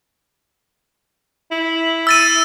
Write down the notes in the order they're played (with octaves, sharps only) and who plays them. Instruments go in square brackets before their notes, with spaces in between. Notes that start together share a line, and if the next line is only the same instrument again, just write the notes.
[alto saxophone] E4
[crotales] E6 A6 D#7